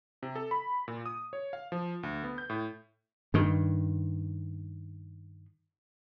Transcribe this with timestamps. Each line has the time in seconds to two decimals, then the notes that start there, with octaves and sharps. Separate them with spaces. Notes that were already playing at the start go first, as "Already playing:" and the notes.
0.23 C3
0.36 A4
0.51 B5
0.88 A#2
1.06 D#6
1.33 C#5
1.53 F5
1.72 F3
2.03 D2
2.24 B3
2.38 G6
2.50 A2
3.34 G2 D#3